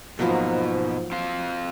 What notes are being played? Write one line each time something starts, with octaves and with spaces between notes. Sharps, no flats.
G#2 B2 F3 F#3 A#3
C4 F4 F5